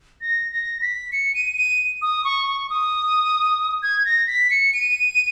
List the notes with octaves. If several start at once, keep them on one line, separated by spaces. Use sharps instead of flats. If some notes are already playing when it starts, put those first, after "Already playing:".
A#6
A#6
B6
C#7
D#7
D#7
D#6
C#6
C#6
D#6
G#6
A#6
B6
C#7
D#7